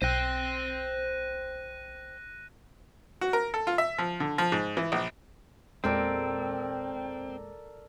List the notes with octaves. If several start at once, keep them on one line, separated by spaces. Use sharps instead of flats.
B1 C5 G5 F#6 A#6 D#7
F#4
A#4
A4
F4
E5
F3
D3
F3
G#2
E3
A#1
E2 A#2 G#3 C4 A4 A#4 D5 G5